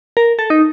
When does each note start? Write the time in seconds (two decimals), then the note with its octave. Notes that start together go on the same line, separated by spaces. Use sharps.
0.17 A#4
0.39 A4
0.50 D#4